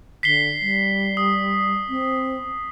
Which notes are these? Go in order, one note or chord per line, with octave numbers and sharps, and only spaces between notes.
D3 B6 C7 G7
G3
D#6
C4